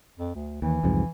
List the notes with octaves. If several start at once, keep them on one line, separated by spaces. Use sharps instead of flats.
F2
D2
D#2 E3
C2 F2 G#2